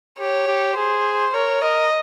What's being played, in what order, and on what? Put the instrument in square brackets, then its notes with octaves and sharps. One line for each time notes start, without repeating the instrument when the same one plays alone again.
[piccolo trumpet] G4 [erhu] C#5
[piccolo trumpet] G4
[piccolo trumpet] G#4 [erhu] C5
[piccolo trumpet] A#4 [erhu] C#5
[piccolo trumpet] A#4 [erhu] D#5